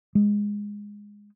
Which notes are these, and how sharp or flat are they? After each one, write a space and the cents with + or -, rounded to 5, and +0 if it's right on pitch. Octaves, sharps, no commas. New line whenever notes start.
G#3 -10